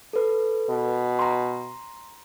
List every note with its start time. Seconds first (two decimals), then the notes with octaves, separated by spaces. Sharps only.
0.13 A4 B4
0.70 B2
1.19 A#5 C6